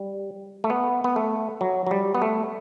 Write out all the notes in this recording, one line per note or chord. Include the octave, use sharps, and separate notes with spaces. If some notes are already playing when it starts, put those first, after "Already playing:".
Already playing: G3
A3
B3
B3
A3
F#3
F#3
G3
B3
A3